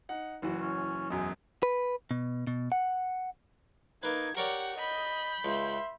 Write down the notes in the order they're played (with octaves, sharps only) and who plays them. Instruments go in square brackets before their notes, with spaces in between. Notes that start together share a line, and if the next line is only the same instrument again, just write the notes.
[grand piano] D#4 F#5
F#1 E3 F#4
[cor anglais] C#4
[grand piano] E1 F#2 [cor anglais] G#3
[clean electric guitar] B4
B2
B2
F#5
[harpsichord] A#3 B4 [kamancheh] D#4 [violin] G#6
[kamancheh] G4 [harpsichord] A#4 C#5 D5 [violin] F#5
[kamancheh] D#5 [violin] B5 G6
[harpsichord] C#2 [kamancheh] E5 C6